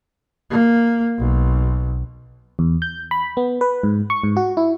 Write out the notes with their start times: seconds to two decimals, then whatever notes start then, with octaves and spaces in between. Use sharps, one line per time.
0.50 A#3
1.18 B1
2.59 E2
2.82 G6
3.11 B5
3.37 B3
3.61 B4
3.83 G#2
4.10 C#6
4.24 G#2
4.37 F#4
4.57 E4